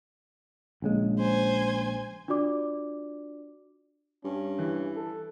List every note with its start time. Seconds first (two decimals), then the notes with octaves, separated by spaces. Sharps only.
0.82 A#1 C#3 G#3
1.19 C5 G#5
2.28 D4 F4 F#4 D5 D6
4.24 G2 C#4
4.59 E3
4.96 A4